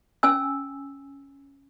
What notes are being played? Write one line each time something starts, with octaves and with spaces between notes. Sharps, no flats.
C#4 G#5 E6